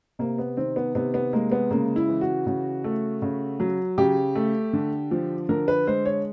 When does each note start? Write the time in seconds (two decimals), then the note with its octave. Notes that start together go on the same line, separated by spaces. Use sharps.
0.19 C3 A#3
0.38 B3
0.57 D#3 C4
0.76 B3
0.95 C3 B3
1.14 B3
1.33 G#3 A#3
1.52 B3
1.71 C#3 A#3
1.96 E4
2.09 E3
2.21 F#4
2.46 C#3
2.84 A3
3.22 C#3
3.60 F#3
3.98 C#3 G4
4.35 A3
4.73 D3
5.11 F3
5.49 D3 A#4
5.68 B4
5.87 G#3 C5
6.06 C#5